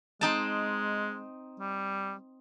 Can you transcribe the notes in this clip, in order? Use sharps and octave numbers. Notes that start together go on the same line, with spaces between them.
G#3 C4 D#4 A5
G3